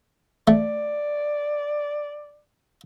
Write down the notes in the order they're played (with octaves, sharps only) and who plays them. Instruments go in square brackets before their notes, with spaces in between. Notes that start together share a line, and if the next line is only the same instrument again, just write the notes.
[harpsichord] A3 [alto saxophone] D5